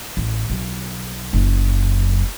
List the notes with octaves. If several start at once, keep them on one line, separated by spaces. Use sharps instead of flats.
A1
B1
F#1 F#2